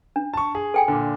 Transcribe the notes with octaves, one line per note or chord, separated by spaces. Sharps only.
D4
A5 C#6
G#4
A4 G5 G#5
A#2 D3